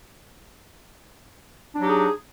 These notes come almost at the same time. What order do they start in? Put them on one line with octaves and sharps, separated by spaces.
D4 F#3 G4 D#4 G#4